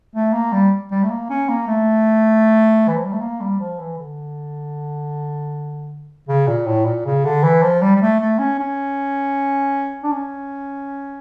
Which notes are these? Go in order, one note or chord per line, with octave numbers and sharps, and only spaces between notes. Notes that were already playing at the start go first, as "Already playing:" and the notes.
A3
A#3
G3
G3
A3
A#3
C#4
A#3
A3
E3
F3
G3
A3
A#3
G3
F3
E3
D3
C#3
A#2
A2
A#2
C#3
D3
E3
F3
G3
G3
A3
A3
C#4
C#4
D4
C#4